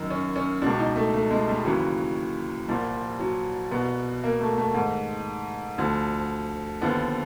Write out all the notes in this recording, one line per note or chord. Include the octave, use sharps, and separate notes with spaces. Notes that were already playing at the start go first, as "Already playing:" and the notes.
Already playing: F#2 D#3
C#4
C#4
C#2 B2 D4
D#4
A3
A3
G#3
G3
D#2 C#3 E3 F#3
C2 A#2 F3 G3
F#3
C2 B2 B3
A#3
A3
A3
G#2 D#3
D2 D3 F3
D#2 D3 F3 B3